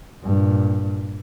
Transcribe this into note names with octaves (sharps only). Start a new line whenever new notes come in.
G2 A#2